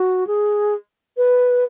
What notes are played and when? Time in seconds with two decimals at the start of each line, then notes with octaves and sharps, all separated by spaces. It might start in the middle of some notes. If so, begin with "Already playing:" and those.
Already playing: F#4
0.27 G#4
1.17 B4